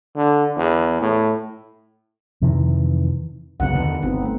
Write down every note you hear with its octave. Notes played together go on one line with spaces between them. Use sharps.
D3
E2
A2
F2 C3 D#3 E3
C2 F#2 C#3 B3 F#5
E2 D3 D#3
G1 B3 C4 D#4
A3 B3